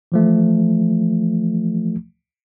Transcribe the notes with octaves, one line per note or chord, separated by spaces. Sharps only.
E3 F3 A3